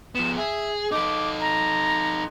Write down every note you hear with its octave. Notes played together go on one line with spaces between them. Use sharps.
F3 B3 E7
G#4 E5
D#4 A4 D6
A#5